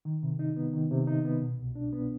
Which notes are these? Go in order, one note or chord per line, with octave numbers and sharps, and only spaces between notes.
D#3
C3
D#4
B3
D#3
C3
D#4
B3
B2
C2
D4
B3